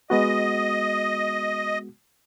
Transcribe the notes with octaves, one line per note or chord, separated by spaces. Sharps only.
G#3 B3 F#4 D#5